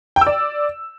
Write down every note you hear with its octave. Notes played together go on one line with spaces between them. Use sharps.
G5
E6
D5